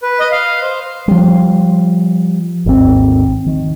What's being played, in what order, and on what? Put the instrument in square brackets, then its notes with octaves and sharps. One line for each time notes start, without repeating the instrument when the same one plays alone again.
[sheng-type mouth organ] B4
D#5
F5
C5
[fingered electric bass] F3 G3
G#1 D#2 D#3 C4
D#3